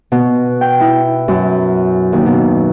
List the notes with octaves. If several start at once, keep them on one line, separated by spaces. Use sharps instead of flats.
B2
G5
E4
F#2
D#2
B2